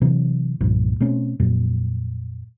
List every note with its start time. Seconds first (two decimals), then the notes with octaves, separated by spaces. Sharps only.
0.01 C3 E3 F#3
0.61 C2 G2 A#2 F3
1.00 B2 A3 C4 C#4
1.40 F2 A#2 F#3